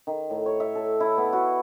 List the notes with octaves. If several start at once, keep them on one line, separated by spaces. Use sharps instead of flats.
D#3
A2
C#5
E5
A4
E4
B3
F#4